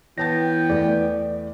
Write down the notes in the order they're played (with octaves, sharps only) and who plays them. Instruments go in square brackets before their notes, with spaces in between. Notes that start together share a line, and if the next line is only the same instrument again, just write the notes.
[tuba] E3 [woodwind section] B3 G5 [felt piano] C#5 A5 A6 [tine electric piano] A#6
[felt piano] E2 A3 [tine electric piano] D5